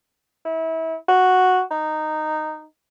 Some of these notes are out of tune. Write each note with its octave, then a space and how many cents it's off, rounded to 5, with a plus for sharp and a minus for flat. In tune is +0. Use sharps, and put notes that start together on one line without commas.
E4 -30
F#4 -5
D#4 -10